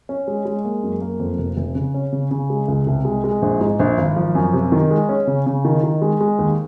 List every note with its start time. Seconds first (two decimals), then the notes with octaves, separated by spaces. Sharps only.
0.09 C#4
0.28 G#3
0.45 G#3
0.65 A#3
0.83 F#2
1.01 A#3
1.20 F2
1.38 F1
1.57 F1
1.75 C#3
1.94 C#4
2.12 C#3
2.31 C#3
2.50 G#3
2.68 C#2
2.87 C2
3.05 G#3
3.24 G#3
3.42 A#1
3.61 G#2
3.79 A#1
3.98 G#1
4.16 F3
4.35 F#2
4.53 C3
4.72 D#3
4.91 G#3
5.09 C#4
5.27 C#3
5.46 C#3
5.65 D#3
5.83 D#3
6.02 G#3
6.21 G#3
6.39 D#2